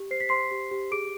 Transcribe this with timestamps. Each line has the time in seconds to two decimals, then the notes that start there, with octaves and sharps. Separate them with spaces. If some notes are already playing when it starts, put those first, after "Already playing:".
Already playing: G4
0.11 C5 C7
0.20 B6
0.29 C5 C6 C7
0.51 G4
0.71 G4
0.91 G#4 D6 D7